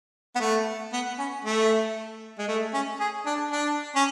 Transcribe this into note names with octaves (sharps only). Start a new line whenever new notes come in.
B3
A3
B3
C#4
A3
G#3
A3
C#4
G#4
D4
D4
C#4